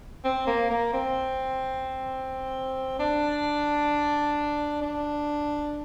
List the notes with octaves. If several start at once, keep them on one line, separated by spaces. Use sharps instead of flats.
C4
A#3
A#3
C4
D4
D4